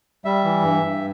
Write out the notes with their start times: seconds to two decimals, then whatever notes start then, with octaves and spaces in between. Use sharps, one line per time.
0.25 G3 E5
0.44 E3
0.63 G2
0.83 G2